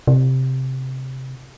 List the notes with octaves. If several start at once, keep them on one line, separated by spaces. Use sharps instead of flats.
C3